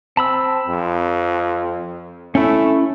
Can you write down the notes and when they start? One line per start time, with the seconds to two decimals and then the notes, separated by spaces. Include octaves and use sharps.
0.17 C4 A5 B5 E6
0.67 F2
2.35 A3 C#4 E4